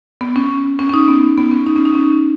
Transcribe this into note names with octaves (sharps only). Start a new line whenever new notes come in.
B3
C#4
C#4
C#4
D#4
B3
B3
C#4
D#4
C#4
D#4
C#4